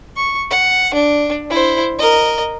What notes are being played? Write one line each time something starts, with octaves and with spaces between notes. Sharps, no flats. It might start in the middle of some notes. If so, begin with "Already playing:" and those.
C#6
F#5
D4
E4 C5
A#4 D#5